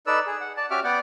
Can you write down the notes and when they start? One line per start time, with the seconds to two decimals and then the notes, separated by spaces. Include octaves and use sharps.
0.07 D#4 A4 B4 D5 E6
0.26 G#4
0.41 F#5
0.57 D5 A5
0.71 C#4 F#4 G4 E5 D6 F6
0.84 B3 D5 F#5 G5 D6